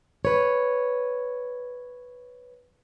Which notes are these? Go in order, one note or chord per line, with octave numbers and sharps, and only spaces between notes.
B4 C#5